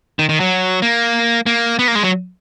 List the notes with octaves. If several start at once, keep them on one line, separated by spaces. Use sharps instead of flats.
D#3
D#3
F#3
A#3
A#3
B3
A#3
G#3
F#3